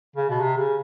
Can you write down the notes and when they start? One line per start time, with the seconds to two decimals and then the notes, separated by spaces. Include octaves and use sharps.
0.16 C#3
0.30 B2
0.41 C3
0.57 C#3